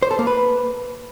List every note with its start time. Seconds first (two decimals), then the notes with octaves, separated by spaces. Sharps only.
0.03 C5
0.11 A4
0.19 A#3
0.27 B4